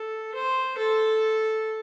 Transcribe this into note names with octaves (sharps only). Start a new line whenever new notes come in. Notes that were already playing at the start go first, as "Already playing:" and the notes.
Already playing: A4
C5
A4